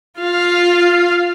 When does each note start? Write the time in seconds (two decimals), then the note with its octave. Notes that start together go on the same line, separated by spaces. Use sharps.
0.19 F4 F5